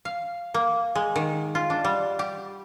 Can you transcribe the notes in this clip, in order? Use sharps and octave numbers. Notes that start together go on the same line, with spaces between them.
F5
A#3
G#3
D#3
F4
D4
G3
G4